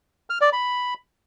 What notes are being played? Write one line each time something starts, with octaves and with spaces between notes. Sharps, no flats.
F6
D5
B5